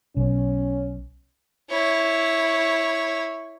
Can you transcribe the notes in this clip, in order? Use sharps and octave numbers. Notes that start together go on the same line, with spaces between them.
B1 C#4
E4 C#5